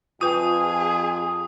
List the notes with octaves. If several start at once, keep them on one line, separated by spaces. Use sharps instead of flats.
F2 F4 G#4 B4 G5 D#6